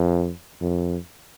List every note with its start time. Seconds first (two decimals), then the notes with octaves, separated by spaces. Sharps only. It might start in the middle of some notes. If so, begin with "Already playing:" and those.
Already playing: F2
0.61 F2